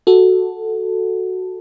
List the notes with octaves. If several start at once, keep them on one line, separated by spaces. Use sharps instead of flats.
F#4 A4